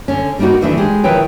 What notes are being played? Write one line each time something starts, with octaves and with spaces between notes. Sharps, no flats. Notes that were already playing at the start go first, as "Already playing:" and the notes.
D3 C#4
G3 A#3 D4 D#4 F#4
D2 C3 D#3 E3 A3 D4
G#3 G4
D#3 F3 E4 B4 C#5 G5